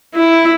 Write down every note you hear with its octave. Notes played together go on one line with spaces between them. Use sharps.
E4